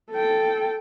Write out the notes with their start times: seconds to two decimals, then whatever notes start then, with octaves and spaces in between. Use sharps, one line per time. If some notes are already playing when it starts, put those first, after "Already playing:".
0.12 A4 G5